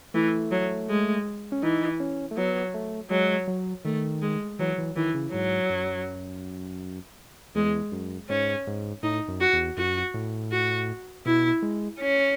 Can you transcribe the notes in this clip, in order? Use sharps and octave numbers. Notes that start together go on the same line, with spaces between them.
E3 A3
F#3
G#3
C#4
E3 D#4
C#4
A3
F#3 B3
A3
F#3 G#3
F#3
D#3 A3
G#3
E3 F#3
E3
D#3 E3
C#3
G#2 F#3
F#2
E2 G#3
F#2
G#2 C#4
G#2
A2 D#4
F#2
F#4
E2
F#2 F#4
A2
F#4
B2 E4
G#3
C#4